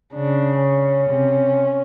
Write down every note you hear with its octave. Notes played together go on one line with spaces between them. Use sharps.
C#3 D4
C#4
C3